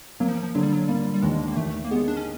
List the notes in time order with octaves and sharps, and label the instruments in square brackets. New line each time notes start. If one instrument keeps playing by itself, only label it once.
[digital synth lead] F#3 [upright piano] A#3
[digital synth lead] F3
F3
[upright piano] D3 [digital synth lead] F#3
[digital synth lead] G3
F#3
[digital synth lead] G3 [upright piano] A#3
[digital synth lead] G3
[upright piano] D#2 [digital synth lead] G#3
[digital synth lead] A#3
[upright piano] D#2 [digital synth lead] A3
[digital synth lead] A#3
[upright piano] G#3 [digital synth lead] B3
[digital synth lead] D4
C#4